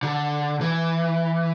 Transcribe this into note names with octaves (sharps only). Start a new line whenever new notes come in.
D3
E3